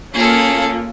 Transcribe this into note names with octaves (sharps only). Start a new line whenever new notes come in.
A#3 C#4 F4 G#4 A4